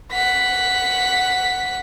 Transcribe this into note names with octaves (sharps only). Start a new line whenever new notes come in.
F#5 B6